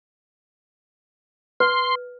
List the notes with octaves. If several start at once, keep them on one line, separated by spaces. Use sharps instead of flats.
B4 C6